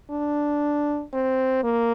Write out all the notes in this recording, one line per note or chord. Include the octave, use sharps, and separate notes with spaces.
D4
C4
A#3